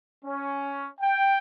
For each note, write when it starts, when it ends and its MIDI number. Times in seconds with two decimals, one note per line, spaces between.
0.24 0.87 61
1.00 1.38 79